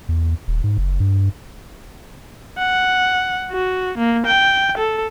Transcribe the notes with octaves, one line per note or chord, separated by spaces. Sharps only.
E2
D#1
G#2
F#1
G2
F#5
F#4
A#3
G5
A4